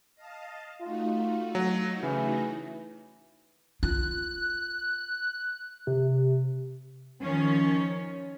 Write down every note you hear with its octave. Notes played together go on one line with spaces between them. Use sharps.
D#5 F5 A5
A3 D#4 F4 F#4
F#3
C#3 E3
F4 F#6
C3
D#3 F3 C#4